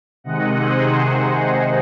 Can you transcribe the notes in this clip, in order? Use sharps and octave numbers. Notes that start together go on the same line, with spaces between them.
C3 D#3 G#3 D#5 F#5
G#4 C5